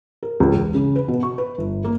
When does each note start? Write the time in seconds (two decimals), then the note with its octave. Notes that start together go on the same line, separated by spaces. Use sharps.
0.23 A#4
0.40 C#2
0.54 E1
0.74 C#3
0.96 B4
1.08 B2
1.23 C#6
1.38 B4
1.58 G1
1.84 A#3